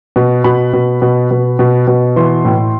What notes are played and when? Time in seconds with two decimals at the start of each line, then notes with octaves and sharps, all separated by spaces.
0.16 B2
0.44 B2 B5
0.73 B2
1.02 B2
1.31 B2
1.59 B2
1.87 B2
2.16 E3 C6
2.45 A2